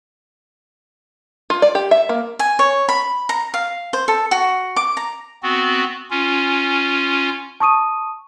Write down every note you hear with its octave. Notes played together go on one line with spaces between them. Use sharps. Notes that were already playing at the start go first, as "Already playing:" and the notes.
F4
D5
G4
E5
A#3
G#5
C#5
B5
A#5
F5
C5
A4
F#4
D6
A#5
B3 C4 F#4
C#4 F4
A5 C#6 D#6 D#7